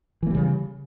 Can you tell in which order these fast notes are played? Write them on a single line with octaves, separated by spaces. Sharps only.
E3 A#3 G3 C#3